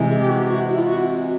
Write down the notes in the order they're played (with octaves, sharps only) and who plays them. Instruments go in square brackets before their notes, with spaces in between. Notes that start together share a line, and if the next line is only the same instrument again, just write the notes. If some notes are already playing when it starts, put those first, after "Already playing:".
Already playing: [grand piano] C3 E3 G#3
[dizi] G#4
G4
F#4
F#4
E4
F4
F#4